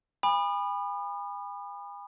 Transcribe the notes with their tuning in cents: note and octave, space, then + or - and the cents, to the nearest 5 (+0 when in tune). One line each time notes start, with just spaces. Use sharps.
G#5 -40 B5 +0 D#6 -40